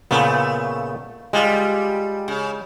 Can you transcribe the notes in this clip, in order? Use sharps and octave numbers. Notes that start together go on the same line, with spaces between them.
A#2 C#3 A3 B3
G3 G#3 F4
C#3